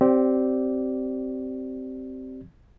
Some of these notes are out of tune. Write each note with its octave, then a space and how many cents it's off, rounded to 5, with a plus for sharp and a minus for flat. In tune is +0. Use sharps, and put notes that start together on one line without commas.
C4 +0 G4 -25 D5 -5